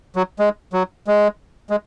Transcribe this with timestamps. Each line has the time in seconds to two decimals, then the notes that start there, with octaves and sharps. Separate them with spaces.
0.16 F#3
0.39 G#3
0.73 F#3
1.07 G#3
1.70 G#3